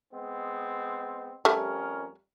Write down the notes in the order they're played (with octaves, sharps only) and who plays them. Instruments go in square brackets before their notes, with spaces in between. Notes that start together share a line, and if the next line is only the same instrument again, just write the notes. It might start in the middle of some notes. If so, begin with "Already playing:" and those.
[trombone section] G#3 B3 C4
[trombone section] F2 C#4 A#4 [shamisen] G3 A3